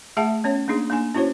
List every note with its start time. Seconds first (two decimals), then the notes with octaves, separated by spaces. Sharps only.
0.17 A3 G#4 E5 F#5 A5
0.44 B3 C#4 C#5
0.68 A#3 D4 D#4 G#4
0.90 A#3 D4 D#4 G#5
1.15 C#4 E4 F#4 C5 C#5